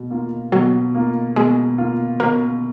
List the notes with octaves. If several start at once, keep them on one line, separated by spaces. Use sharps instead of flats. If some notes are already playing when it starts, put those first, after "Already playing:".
Already playing: B2
A#3 F4
B2 F#3
A#3 F4
B2 G#3
A#3 F4
B2 A#3